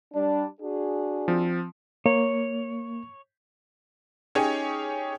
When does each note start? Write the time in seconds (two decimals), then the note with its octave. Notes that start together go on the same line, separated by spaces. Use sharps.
0.14 G3 D4
0.60 D4 F#4 G#4
1.28 F3 C4
2.06 A#3 C#5
4.35 C#4 D#4 G4 G#4 C#5